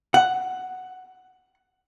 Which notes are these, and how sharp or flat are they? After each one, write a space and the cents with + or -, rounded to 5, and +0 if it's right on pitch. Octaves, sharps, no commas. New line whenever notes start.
F#5 +5